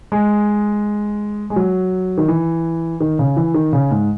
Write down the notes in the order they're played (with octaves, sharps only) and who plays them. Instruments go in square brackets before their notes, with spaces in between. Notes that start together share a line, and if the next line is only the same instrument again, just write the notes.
[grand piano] G#3
G#3
F#3
D#3
E3
D#3
C#3
E3
D#3
C#3
G#2